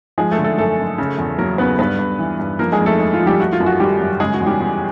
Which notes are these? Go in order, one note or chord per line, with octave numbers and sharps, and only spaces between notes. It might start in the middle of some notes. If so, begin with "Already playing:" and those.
F3 G#3 G#4
A3 A4
D3
A3 A4
F#2 A3 A4
F#2
C#3
E2
F#3 A#3 A#4
C#3 B3 B4
G2 B3 B4
G2
E3
G2
F3 A#3 A#4
G#3 G#4
F2
A3 A4
G#3
F4
F3
G3 G4
A3 F#4
F4
F#2
F#4
D#3 G3 G4
F#2
C#3 G#3 G#4
F#4
E2
G3 G4
E2